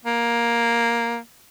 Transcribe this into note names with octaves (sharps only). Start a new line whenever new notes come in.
A#3